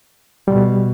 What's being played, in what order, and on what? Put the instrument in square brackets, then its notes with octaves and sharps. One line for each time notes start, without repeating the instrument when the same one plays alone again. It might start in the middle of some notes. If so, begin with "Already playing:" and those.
[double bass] B2 [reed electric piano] G3